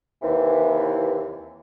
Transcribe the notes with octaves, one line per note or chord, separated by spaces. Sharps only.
D#2 C3 E3